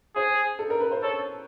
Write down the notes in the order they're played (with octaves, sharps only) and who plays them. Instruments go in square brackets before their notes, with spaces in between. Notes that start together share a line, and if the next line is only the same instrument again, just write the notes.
[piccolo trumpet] G#4 [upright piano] C5
[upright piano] A4
A#4
B4
C5
[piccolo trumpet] A4 [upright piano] C#5